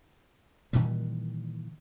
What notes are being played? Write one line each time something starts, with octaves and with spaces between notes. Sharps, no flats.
A#2 D#3 E3 G3